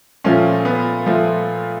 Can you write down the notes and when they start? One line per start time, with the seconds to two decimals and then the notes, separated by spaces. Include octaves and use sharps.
0.24 A#2 F3 A3 C#4
0.65 B3
1.06 A#2 F3 A3